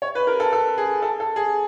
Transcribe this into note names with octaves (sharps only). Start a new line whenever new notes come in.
C#5
B4
A#4
A4
A4
G#4
A4
A4
G#4